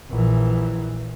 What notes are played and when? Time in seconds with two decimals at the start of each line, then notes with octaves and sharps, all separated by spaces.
0.11 A#1 E3